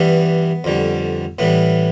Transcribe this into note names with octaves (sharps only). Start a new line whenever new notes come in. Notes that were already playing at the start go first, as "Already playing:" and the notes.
Already playing: G2 E3 G3 B3
F2 D3 G3
A2 E3 G3 B3